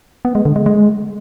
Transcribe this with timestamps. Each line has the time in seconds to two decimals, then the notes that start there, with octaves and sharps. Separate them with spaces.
0.25 B3
0.35 G#3
0.45 D3
0.56 G#3
0.66 G#3